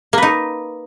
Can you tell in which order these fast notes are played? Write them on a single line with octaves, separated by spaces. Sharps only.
A#3 B4 D#4